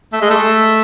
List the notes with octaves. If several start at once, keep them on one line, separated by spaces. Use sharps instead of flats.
A3
G#3
A3